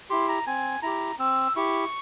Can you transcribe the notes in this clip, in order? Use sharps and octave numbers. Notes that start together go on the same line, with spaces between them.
E4 G4 C6
A#5
C4 G#5
E4 G4 A#5
C4 E6
E4 G4 C#6